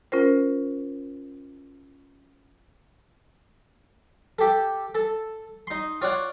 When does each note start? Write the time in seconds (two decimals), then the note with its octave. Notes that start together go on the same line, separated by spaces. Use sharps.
0.12 C#4 F4 A#4 C5
4.39 G4 A4
4.95 A4
5.67 D#4 C6
6.02 F4 C#5 D5 F#5